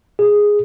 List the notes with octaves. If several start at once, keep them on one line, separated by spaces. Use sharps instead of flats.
G#4